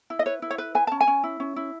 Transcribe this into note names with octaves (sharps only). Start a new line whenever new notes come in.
E4
D#5
B4 C#5
E4
C#5
B4
B4 G#5
C#4 A5
G#5
C#4
E4
C#4
E4